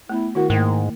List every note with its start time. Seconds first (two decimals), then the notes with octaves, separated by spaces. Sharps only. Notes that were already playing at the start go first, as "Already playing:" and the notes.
0.09 A3 B3 E4
0.35 D#3 E4 F#4 A#4
0.50 G#2 D#3 A3 A#3